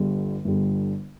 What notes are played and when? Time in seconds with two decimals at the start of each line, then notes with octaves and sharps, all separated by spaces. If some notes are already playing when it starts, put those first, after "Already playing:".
Already playing: G1 G2 D3 G3
0.45 G1 G2 D3 G3